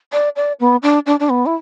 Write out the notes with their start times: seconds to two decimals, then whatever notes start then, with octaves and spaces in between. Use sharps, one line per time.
0.13 D5
0.36 D5
0.60 B3
0.83 D4
1.06 D4
1.20 D4
1.30 B3
1.46 E4